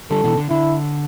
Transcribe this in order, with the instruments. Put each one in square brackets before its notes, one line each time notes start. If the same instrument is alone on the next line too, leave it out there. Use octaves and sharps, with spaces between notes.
[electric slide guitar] D3 G3 [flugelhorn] A4
[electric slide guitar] B2 E3
D3
[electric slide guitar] D3 [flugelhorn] E4